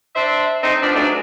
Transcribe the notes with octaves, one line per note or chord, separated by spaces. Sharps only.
D4 C5 E5
A3 C4 D#4
F3 B3 C4 D4
G#2 F#3 G#3 A3 D4